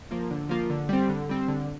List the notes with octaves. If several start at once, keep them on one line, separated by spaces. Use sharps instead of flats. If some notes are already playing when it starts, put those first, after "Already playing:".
F3 A#3 F4
D3
F3 A#3 F4
D3
G3 C4
D3
G3 C4
D3